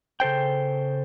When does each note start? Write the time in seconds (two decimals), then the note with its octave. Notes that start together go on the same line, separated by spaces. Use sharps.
0.20 C#3 A4 C5 G5